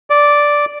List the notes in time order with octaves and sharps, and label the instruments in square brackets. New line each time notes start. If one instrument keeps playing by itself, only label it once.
[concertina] D5